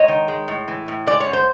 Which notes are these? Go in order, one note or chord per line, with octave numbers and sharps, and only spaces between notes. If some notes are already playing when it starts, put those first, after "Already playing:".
Already playing: G#2 C#5 D#5
D#3
G#3
A2
E3
A2
G#3 D5
C#5
F#2
C5